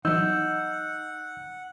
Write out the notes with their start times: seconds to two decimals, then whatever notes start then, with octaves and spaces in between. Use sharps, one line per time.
0.05 E3 F#3 D#4 F#5 E6 G6